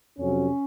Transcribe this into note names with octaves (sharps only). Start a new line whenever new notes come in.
F2 C3 F#3 C#4